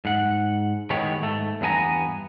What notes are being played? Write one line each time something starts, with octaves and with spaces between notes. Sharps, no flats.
G#2 F#5
A2 D#3 G#3 B3 G4 C#5
G#2 A3
E2 G2 B3 G#5 A#5